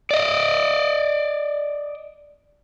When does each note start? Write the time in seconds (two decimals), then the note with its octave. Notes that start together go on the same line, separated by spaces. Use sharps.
0.11 D5 D#5